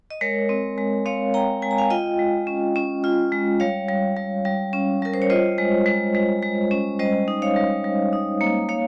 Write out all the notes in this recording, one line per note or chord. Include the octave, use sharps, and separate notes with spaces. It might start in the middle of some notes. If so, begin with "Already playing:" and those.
D#5
G#3 A#4 C#5
C4
G#3
C4 C#5 F5
C4 G5 A#5
G#3 G#5
A#5
F5 G#5
F4 D#5 G5
G#3
C#4
C#4
F4
G#3
G3 C#5 F5
G3
G3
G3
C#4
G3 A#4
C5
C#5
F4 C5 D#5
G#3
G#3
G#3
G#3
C#4
G3 C5 D#5
D#4
C#5 F5
G3
G3
D#4
A#3
A#3 C#5 F5